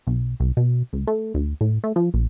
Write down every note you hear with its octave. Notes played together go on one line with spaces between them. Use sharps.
B1
C2
B2
C#2
A3
D2
A2
A3
F3
A#1